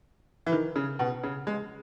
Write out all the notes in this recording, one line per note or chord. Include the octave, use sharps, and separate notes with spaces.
E3
D#3
C#3
B2
C#3
G#3